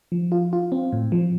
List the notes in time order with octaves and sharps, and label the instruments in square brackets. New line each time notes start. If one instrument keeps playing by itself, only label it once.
[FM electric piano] F3
F4
F4
C4
A2
F3